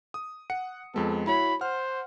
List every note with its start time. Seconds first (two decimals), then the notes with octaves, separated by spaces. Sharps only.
0.14 D#6
0.50 F#5 C#7
0.94 F2 G#3 B3 A4
1.27 E4 F#4 C#5 B5
1.61 C5 F#5 F6